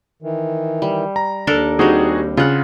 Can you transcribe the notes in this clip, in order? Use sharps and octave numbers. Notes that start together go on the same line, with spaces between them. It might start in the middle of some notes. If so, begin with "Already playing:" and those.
D#3 E3
G3
A#5
D#2 D4 A4 A#4
G3 C4 D#4 F#4 G#4
C#3 F4 F#5